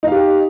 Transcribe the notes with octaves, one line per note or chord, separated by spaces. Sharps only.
D#4 G4 F5